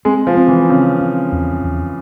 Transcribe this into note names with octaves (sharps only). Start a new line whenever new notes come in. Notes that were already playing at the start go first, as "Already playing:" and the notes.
G#3 C4
F3
C4
E3
C#3 C4
C4
E2
E2